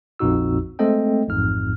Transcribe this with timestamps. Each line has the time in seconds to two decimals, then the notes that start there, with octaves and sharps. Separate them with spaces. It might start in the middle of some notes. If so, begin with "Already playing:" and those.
0.19 A#1 F2 A#2 D#4 F#4 E6
0.79 G#3 A3 C4 A4 D#5 G5
1.28 A1 F2 G#2 F6